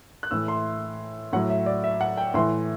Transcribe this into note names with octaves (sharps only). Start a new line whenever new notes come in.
F#6
A2 E3 E6
C6
A2 F#3 F#5
E5
D5
E5
F#5
G5
A2 E3 C6